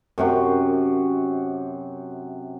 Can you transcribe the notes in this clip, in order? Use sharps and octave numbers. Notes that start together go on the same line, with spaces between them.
F#2 C3 F#4